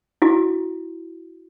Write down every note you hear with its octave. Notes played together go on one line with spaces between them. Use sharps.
E4 F#4